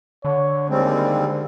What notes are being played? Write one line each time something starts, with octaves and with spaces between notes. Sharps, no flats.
D3 C#5
D#2 G3 G#3 C4